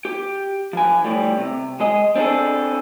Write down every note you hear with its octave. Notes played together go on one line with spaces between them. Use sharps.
G4
F3 G#5
A2 G3
C3
G#3 G#4 D#5
C4 D4 F#4 G#4 A4